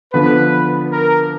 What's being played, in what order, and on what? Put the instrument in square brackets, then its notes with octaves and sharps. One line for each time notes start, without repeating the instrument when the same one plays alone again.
[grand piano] D3 F3 B3 [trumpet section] B4
[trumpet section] A#4